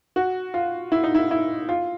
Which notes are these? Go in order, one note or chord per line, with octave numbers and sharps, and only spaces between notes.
F#4
F4
E4
D#4
E4
E4
F4